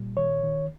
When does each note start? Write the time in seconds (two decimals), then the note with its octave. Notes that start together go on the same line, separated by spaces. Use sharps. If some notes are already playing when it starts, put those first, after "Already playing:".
Already playing: A#2 G3
0.17 D#3 C#5
0.43 D#3